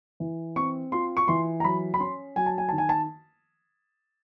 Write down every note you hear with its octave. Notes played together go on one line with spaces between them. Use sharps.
E3
C4 C#6
F4 C6
C#6
E3 C6
A#5
F#3 B5
B5
C#4 C6
F#3 G#5
A5
G#5
D#3 A5
G#5
A5